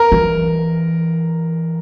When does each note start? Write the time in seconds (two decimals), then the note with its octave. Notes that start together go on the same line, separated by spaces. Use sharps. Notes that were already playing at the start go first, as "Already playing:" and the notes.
Already playing: A#4
0.12 E3